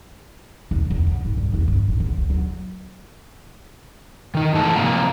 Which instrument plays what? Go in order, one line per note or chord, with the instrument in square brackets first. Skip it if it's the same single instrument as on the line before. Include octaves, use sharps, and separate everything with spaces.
[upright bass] D#2
E2
B3
G#2
G3
D#2
G2
A1
D3
D2
F#3
[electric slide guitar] D#3 D#4
G#2 E3 G#3 A3 A5
C3 F3 A#3 F5 A#5